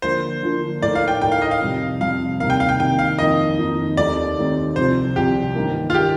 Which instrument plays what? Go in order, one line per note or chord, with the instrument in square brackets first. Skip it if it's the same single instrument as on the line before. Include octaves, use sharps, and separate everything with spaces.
[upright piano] D3 F3 A#3 D4 [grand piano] C5
[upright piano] D3 F3 A#3 D4
[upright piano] A2 A3 D#4 A#4 [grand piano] D5
[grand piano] F5
G5
[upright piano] A2 A3 D#4 A#4 [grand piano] G5
[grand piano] F5
D#5
F5
[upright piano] F2 C3 G3
[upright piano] F2 C3 G3 [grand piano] F5
[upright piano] C2 C3 D#3 A#3 [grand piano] F5
[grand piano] G5
F5
G5
[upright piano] C2 C3 D#3 A#3 [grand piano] G5
[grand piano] F5
[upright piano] F2 D#3 A#3 D#4 [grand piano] D#5
[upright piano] F2 D#3 A#3 D#4
[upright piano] D#2 D#3 A3 C4 [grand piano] D5
[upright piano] D#2 D#3 A3 C4
[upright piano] C2 C3 F3 [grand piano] C5
[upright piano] C2 C3 F3 [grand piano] G4
[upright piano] A1 G2 D#3 A#3
[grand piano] F4
[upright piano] D#3 A#3 [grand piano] G4